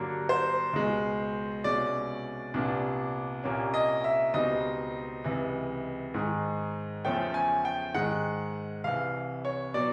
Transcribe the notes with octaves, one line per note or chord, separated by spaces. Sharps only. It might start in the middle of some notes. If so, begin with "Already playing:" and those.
Already playing: G2 D3 F#3 A#3
C5
C#2 B2 G#3
C2 B2 G#3 C#4 D5
C2 A#2 G3 B3 D4
C2 A#2 G3 A#3 C#4
D#5
E5
C#2 B2 G3 C4 D#4 D#5
C#2 C3 E3
G#2 D#3 G#3
E2 C#3 F3 A3 C#4 G5
G#5
G5
G#2 D#3 G#3 F#5
C2 C3 E3 F5
C#5
B2 F#3 D5